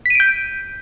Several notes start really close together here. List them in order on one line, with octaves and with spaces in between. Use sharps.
B6 D#7 D7 G6